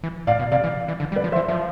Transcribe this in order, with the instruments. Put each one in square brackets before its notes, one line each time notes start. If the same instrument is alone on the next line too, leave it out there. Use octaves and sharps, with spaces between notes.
[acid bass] E3
[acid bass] A2 [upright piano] D5 F5
[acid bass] B2
[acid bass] C3 [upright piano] D5 F5
[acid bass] E3
E3
D3
G3
[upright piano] B4 D5
[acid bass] F3
[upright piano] C5 E5
[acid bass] E3
[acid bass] F3 [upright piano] C5 E5